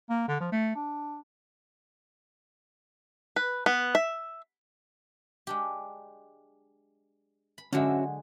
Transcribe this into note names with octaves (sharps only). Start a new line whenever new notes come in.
A#3
D3
F3
A3
D4
B4
B3
E5
G#3 D4 G4
B5
D3 F#3 G#3 C#4 F#4 E5